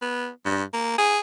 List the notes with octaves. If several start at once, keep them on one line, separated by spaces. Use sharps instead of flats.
B3
G2
A#3
G#4